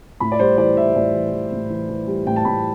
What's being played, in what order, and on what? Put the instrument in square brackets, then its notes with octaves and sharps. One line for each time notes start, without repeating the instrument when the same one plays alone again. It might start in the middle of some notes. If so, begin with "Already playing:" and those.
[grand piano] A2 B5
D5
G3 C5
E3 D5
E3 E5
A2 D5
E3
E3
A2
E3
E3
G3
A2 G5
A5
A2 B5